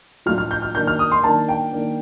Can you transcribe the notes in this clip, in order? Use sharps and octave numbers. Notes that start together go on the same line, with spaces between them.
A2 F3 A3 D4 F4 F6
F6
G6
F6
D#3 A#3 D4 G6
F6
D#6
C6
D#3 A#3 D4 A5
G5
D#3 A#3 D4